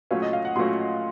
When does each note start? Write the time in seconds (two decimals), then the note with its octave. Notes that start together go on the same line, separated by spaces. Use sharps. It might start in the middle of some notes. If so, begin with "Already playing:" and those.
0.11 A#2 F#3 A3 C#4 F#4 F5
0.22 D#5
0.33 F5
0.45 F#5
0.56 A#2 F#3 A3 C#4 F#4 C6